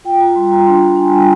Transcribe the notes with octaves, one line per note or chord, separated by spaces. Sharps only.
F4 G5
F4 A#5
G3 C6
F4 A#5
D4 C6
D4 A#5
D4 G#5
G3 G5